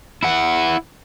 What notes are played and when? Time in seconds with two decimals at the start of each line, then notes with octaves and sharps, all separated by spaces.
0.23 E4 F#5